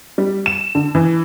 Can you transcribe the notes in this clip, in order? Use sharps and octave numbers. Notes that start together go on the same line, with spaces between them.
G3
E7
D3
E3